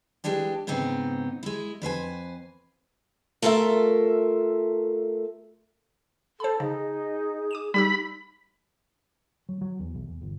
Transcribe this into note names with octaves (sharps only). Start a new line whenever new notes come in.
E3 G3 G#3 D4 G4
G#2 C#3 B3 C4 D#4
G#3 E4
F2 B4 C5 G#5
A3 F4 A4 A#4 E5
A4 C5 B5
C#3 D#4 G#4
D6 D#7 E7
G3 D#4 G4 B5 E6
F#3
F#3
E2
B1
E2
G1